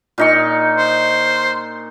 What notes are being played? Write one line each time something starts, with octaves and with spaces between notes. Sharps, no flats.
A#2 D#4 C#6
C5